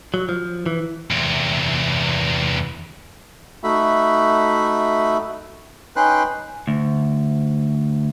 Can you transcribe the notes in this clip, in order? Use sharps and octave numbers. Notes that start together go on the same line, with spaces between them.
F#3
F3
E3
E2 C3
A3 D#4 F#4 E5 B5
C#4 D#4 B4 G5 C6 F#6
D2